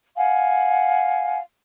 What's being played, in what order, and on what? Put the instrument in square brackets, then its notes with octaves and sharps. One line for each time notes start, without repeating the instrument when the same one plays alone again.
[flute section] F5 F#5 G#5